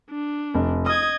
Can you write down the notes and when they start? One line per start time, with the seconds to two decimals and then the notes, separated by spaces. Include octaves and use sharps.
0.10 D4
0.54 F1
0.86 D#5 D#6 G#6